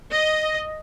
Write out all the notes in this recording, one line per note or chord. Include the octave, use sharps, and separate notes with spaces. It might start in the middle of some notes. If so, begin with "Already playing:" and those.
D#5